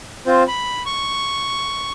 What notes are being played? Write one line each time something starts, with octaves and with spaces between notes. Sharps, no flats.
C4 F4 C5
B5
C#6